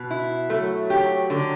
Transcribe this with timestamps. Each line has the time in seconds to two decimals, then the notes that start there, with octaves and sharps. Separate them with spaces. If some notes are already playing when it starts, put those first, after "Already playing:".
Already playing: B2
0.11 E4
0.50 F#3 A3
0.90 G4
1.30 D3